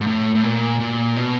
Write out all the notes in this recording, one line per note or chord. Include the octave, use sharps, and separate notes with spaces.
G#2
A2
A2
A#2
A#2
B2